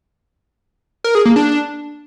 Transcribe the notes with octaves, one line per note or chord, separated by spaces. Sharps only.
A#4
G#4
A#3
D4